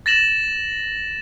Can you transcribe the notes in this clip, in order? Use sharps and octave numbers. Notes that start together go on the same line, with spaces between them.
A6 A#6 E7 F#7